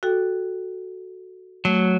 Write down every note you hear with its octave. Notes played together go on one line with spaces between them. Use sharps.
F#4 A4 G5
F#3 A3